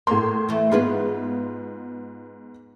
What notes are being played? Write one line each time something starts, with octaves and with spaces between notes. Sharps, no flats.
A2 A#3 C6
E3 A3
G#2 B3 F4 G#4 B4